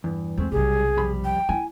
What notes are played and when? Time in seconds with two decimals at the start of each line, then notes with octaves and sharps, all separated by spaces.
0.04 E2 G2
0.38 E2 G#3 A3 C4
0.52 B1 C3 G3 G#4
0.97 F2 G3 B5
1.25 G5
1.49 E4 G#5